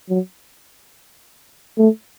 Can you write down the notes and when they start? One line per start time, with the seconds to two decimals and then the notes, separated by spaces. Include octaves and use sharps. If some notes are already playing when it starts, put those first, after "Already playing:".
0.09 F#3
1.78 A3